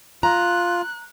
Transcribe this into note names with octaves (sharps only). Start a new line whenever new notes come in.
F4 A#5 F#6